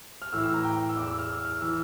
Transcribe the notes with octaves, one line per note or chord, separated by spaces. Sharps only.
F6
A2 E3 E6
E6
A#5
G5
E6
E2 E3 D6
E6
F6
E6
F6
E3 E6